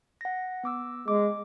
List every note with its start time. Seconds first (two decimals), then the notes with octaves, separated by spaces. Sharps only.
0.21 F#5 A#6
0.64 B3 D6 E6
1.08 G#3 D6